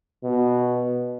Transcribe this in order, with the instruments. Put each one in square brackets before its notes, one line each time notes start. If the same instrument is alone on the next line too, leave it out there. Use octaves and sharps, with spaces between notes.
[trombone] B2